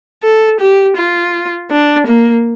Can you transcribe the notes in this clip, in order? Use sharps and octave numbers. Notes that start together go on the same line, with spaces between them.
A4
G4
F4
D4
A#3